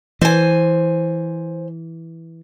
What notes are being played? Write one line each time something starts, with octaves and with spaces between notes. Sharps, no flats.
E3 C5 G#5